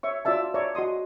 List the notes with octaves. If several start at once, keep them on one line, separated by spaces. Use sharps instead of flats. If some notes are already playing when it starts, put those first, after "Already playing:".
C#5 E5 C#6
F4 F#4 D5 E5 A5
C#5 D5 E5 A5 A#5 C#6
F#4 D#5 C6 D#6